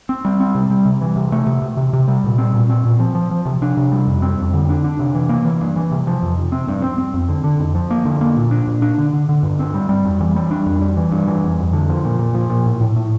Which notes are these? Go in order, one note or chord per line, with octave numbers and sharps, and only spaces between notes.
C4
G3
C4
C3
G3
C3
E3
C3
A3
C3
C3
C3
C3
G3
A#2
C4
A#2
C4
A#2
F3
F3
F3
C3
D4
C3
G3
F2
C4
F2
D3
D4
D4
C3
E3
A#3
E3
G2
E3
C3
F3
F2
C3
C4
G2
C4
C4
F2
D3
D3
F2
F3
A#3
D3
A#3
A#2
D4
A#2
D4
D3
D3
D3
G2
C4
G3
G3
F2
E3
G3
D4
F2
G3
E3
G2
E3
F2
F2
D3
F3
A#2
A#2
F3
A#2
A2
A2
A2